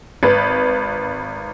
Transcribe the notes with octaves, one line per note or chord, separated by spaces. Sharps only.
G#1 B4